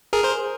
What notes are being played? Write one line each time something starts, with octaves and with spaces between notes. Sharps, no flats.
G#4 A#4
A#4 C5